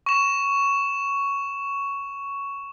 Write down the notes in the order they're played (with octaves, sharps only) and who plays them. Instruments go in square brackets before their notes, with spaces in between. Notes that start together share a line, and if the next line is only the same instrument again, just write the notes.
[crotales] C#6 E7